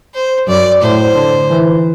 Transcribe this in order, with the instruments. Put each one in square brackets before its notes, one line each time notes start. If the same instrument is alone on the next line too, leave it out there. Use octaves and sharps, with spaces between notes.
[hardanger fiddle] C5
[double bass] F#2 [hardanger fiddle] D5
[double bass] A2 [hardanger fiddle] C5
[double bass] D3
E3